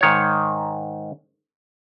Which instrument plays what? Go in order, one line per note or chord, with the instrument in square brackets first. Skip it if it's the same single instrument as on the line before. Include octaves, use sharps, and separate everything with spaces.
[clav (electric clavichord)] G#2 D#3 C#5